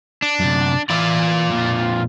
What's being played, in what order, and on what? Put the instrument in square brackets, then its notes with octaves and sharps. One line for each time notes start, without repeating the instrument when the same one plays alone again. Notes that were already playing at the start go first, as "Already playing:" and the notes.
[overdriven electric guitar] D4
[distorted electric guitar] F#2 C3
[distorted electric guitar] E3 B5 [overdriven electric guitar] F4 D5
[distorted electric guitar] F2 A#2